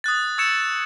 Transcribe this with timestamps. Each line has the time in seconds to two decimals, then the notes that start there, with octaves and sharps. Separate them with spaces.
0.04 D#6 F#6 A6
0.38 C#6 E6 G#6 C#7 E7